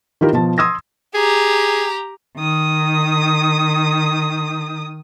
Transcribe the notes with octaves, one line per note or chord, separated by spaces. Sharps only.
D#3 E4 F4 G4 A#4
B2 F3 A5
C6 D#6 E6 G#6 A#6
G4 G#4 A#5
D#3 D#6